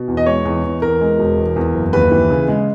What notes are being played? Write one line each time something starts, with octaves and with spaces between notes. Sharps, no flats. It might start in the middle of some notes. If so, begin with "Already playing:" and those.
Already playing: B2
E2
D#5
G#3 C#5
E2
E2
E2 A#4
G#3
E1
E2
E2
F#1
D#2 B4
E3
C#3
G#3